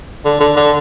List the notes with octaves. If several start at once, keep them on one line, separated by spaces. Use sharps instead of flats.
D3
D3
D3